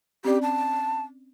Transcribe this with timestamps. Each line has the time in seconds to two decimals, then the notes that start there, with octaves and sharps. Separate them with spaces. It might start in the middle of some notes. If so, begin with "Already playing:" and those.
0.25 C4 C#4 G4 D5
0.42 A5